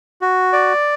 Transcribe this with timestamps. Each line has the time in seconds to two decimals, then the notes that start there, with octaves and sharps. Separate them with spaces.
0.21 F#4
0.53 D5